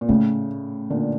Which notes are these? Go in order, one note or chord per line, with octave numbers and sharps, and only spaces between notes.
A#2
A2 C#3 A3
A#2 D3